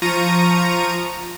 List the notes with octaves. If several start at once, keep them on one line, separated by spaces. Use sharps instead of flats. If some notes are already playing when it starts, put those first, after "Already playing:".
F3 A#5 C#6 D#7